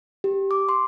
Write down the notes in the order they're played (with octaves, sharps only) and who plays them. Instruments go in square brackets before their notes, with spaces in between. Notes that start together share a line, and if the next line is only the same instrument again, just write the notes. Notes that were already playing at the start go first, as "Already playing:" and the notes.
[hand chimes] G4
D6
C6